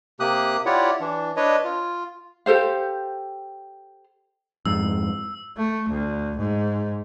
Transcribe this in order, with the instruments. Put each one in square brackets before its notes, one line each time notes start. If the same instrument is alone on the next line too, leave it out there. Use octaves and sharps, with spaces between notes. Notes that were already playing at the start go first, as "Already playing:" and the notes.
[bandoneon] C3 A#3 G4 D#6 F#6
E4 F4 G4 C#5 D5 F#5
E3 D4
D4 B4 C#5 D#5
F4
[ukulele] G4 A4 C5 F5
[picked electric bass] F2 G#2 [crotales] E6
[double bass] A3
D2
G#2